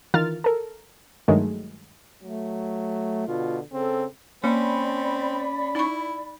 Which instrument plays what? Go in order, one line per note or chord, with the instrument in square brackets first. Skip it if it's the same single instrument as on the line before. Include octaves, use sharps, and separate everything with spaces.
[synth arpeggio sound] D#3 E3 F4 A#4 F6 A6
A4 A#4
G2 D#3 F#3 G#3 A3
[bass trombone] F#3 [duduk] A3
[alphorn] B2 [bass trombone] D3 [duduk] F4
[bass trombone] C#3 [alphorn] C4 [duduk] A4
[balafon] A#3 [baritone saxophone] C4 [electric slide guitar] C#4 [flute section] D5 B5
[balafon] D#4 C#6 [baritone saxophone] E4